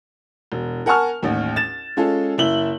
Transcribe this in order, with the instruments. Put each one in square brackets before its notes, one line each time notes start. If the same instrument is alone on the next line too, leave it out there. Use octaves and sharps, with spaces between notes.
[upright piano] E1
A#4 F#5 G#5 A5 C#6 F6
A1 D#2
A6 E7
G#3 C#4 F4 G#4 A4
F#1 E4 E5 F#7 G7